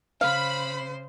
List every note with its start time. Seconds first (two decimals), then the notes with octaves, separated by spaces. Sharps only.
0.21 C#3 C5 F5 B5